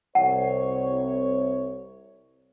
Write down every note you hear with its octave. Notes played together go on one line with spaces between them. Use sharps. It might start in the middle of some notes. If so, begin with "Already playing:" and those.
C2 C#5 F#5